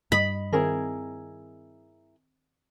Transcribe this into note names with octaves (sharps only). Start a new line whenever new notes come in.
G2 D#5 B5
D#3 C4 E4 G#4 A#4